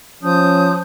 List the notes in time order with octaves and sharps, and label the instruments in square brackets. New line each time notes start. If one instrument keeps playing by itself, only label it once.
[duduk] F3 [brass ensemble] C#4 [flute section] A5 D#6 G6